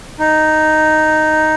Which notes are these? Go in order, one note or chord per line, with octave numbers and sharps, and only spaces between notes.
D#4